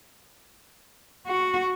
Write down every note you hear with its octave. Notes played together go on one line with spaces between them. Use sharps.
F#4